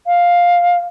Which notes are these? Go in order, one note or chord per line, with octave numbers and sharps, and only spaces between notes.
F5